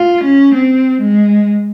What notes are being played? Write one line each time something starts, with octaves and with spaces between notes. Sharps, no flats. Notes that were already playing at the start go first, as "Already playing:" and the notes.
Already playing: F4
C#4
C4
G#3